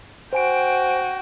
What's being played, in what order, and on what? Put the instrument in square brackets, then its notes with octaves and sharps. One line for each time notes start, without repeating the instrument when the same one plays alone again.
[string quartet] F#4 G5 [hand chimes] C5 G#5 D7